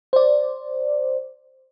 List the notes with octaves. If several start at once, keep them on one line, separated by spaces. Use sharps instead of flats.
C5 D5